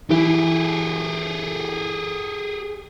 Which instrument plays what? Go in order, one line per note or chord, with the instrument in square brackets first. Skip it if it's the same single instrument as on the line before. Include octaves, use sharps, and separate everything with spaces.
[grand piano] E3 [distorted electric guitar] G4 G#4